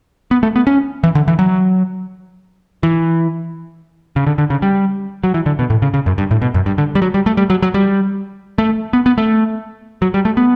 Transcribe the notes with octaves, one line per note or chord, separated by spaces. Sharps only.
B3
A3
B3
C#4
E3
D3
E3
F#3
E3
C#3
D3
D3
C#3
G3
F#3
E3
D3
B2
A2
C#3
C#3
F#2
G2
A2
B2
F#2
G2
D3
G3
F#3
G3
A3
G3
F#3
F#3
G3
A3
B3
B3
A3
F#3
G3
A3
B3